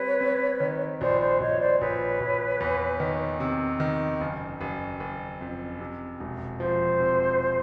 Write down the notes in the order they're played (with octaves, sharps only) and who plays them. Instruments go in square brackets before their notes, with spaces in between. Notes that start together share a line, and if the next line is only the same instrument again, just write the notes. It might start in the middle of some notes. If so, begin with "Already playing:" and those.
Already playing: [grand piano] G3 C4 [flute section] B4 C#5
[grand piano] C4
D#3
[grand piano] A#1 [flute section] C5 D5
[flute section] C5 D5
[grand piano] A#1 [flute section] C#5 D#5
[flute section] C5 D5
[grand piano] A#1 [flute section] B4 C#5
[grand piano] A#1
E2
D#3
C3
D#3
F#1
F#1
F#1
F2
C3
E1
[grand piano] F3 [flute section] C5
[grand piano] C3